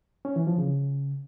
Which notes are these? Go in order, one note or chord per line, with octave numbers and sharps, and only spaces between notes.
C#4
E3
F3
C#3